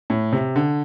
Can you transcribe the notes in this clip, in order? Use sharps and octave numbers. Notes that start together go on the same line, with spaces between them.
A2
C3
D3